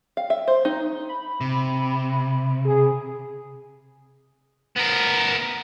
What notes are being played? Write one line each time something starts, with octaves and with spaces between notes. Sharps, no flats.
F5
E5
C5
D#4
B5
C3
G#4
B3 A#4